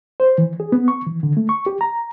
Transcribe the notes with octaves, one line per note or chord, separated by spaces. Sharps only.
C5
E3
G#4
B3
C#6
E3
D3
A3
C#6
G4
A#5